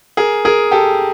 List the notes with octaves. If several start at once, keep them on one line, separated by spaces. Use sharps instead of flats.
G#4 A#4
G#4 A#4
G4 A4